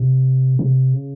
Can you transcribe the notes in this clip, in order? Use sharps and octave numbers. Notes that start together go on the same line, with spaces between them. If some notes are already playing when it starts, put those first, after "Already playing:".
Already playing: C3
C3
C#3